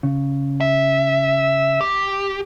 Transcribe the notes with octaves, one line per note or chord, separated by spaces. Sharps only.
C#3
E5
G4